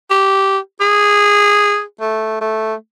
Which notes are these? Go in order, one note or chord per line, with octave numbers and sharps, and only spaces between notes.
G4
G#4
A3
A3